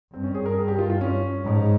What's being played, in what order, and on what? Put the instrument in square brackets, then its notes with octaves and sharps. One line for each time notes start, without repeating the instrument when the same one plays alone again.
[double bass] G2 [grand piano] C4
[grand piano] C#4
G#4
A#4
G#4
G4
F4
F4
C#4
[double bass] G#2